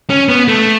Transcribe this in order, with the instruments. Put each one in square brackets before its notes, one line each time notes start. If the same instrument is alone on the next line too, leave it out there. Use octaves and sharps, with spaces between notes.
[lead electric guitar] C#4
B3
A3